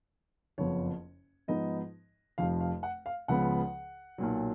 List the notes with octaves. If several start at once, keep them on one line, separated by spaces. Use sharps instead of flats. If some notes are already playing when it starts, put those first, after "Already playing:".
F#1 F2 F3 B3 C#5
G#2 F3 B3 D#4 D#5
F1 F2 F3 F5
F5
F#5
F5
C#2 C#3 F3 B3 F#5
B1 A#2 F#3